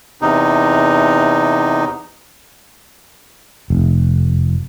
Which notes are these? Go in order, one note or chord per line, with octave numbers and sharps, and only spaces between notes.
E2 C3 D#4
F1